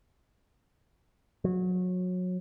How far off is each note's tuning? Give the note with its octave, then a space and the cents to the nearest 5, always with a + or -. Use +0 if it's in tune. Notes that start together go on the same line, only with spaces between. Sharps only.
F#3 -25